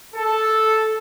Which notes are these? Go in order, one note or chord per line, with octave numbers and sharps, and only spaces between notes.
A4